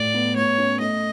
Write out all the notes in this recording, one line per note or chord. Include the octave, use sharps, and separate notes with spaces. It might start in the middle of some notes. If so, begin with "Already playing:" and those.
Already playing: A2 D5
B3
A3 C#5
C#4
A3 D#5